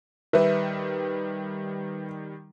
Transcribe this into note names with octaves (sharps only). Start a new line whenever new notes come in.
D#3 G3 B4 E5